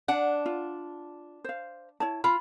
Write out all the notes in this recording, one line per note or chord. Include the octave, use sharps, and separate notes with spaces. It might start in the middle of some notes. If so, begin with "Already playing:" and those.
D4 F#5
F4
C5 F5
E4 C#5 A5
F4 B5